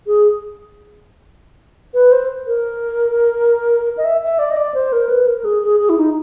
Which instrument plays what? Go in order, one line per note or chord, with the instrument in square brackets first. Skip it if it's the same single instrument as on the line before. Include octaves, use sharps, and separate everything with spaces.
[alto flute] G#4
B4
C5
A#4
D#5
E5
E5
D5
D#5
D5
C5
A#4
B4
A#4
G#4
G#4
G#4
E4
D#4